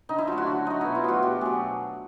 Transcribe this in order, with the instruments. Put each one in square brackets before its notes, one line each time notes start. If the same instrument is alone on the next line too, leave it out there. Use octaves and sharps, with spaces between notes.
[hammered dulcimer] D3 D#4
E4
F#3 A3 F4
F#4
D3
F#3 A3 D#4
B2 E4
F4
F#3 A3 F#4
B2 G4
F#3 A3 G#4